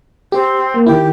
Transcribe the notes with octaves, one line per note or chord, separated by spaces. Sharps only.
C4 G4
A#3
D#3 E4 G4